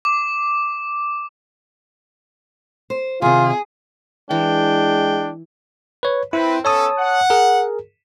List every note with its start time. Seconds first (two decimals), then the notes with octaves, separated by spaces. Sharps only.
0.05 D6
2.90 C5
3.22 C3 D#3 F4 G#4
4.31 E3 G#3 D4 G5
6.03 B4 C#5
6.33 C4 E4 B4
6.65 B3 C#4 A4 C#5 A5 D#6
7.00 F#5
7.30 G#4 A#4